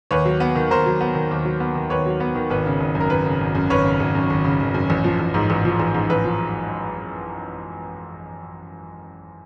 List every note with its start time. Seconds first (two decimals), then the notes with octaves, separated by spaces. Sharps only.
0.11 D#2 B4 C#5
0.25 F#3
0.40 B3
0.55 D#3
0.71 D#2 A#4 C5
0.86 F#3
1.01 B3
1.15 D#3
1.31 D#2
1.45 F#3
1.60 B3
1.75 D#3
1.90 D#2 B4 C#5
2.06 F#3
2.20 B3
2.35 D#3
2.50 G#1 B4
2.66 C#3
2.80 G#1
2.95 F#2
3.00 A#4
3.10 G#1 B4
3.25 C#3
3.41 G#1
3.55 F#2
3.70 G#1 B4 C#5
3.84 C#3
4.00 G#1
4.15 F#2
4.30 G#1
4.44 C#3
4.60 G#1
4.74 F#2
4.90 A1
5.04 F3
5.20 A1
5.34 G#2
5.50 A1
5.65 F3
5.80 A1
5.94 G#2
6.10 A1 B4
6.25 F3